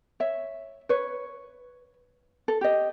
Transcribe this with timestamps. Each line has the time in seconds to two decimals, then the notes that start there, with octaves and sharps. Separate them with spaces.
0.20 C#5 E5
0.89 B4 C#5
2.48 A4
2.61 G4 D#5